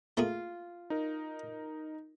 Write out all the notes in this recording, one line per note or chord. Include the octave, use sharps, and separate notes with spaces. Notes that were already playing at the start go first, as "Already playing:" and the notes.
A3 A#3 F4 G#4
D#4 A#4